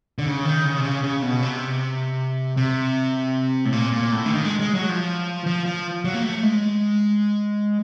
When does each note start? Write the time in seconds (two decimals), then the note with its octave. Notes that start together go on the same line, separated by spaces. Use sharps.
0.19 D3
0.26 C#3
0.45 D#3
0.65 C#3
0.78 C3
0.85 C#3
1.03 C#3
1.22 B2
1.43 C3
2.57 C3
3.65 A2
3.72 A#2
3.92 A#2
4.12 A2
4.26 D3
4.30 D#3
4.45 G#3
4.60 G#3
4.74 F#3
4.89 F3
5.46 F3
5.66 F3
6.05 F#3
6.14 A#3
6.23 A3
6.43 G#3